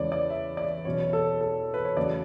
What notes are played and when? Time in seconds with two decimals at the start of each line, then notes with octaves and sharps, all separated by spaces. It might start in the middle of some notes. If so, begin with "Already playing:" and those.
Already playing: E2 C#3 E3 G#3 C#5 D5
0.12 D5
0.30 E5
0.57 D5
0.85 E2 B2 F#3 C#4 C#5
1.13 A4
1.41 A4
1.74 B4
1.85 C#5
1.97 E2 C#3 F#3 A3 D5